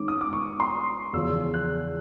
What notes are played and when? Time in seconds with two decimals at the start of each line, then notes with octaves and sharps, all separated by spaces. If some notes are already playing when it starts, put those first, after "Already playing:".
Already playing: D#3 G#3 C#4 D6
0.08 D#6
0.21 D6
0.33 C#6
0.60 C6
1.13 E2 C#3 F3 E6
1.54 F#6